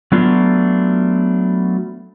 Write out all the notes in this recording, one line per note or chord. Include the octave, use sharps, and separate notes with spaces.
F#3 A3 B3 D4 F4